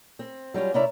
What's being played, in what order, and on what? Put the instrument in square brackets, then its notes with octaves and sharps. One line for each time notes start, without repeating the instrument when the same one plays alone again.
[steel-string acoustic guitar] C4
F#3 G3 C#4 F4
C3 C#4 E4 D5 E5 A#5